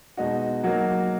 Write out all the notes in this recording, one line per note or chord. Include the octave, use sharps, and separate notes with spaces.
B2 G#3 D#4 F#4
F#3 A#3 D#4 F#4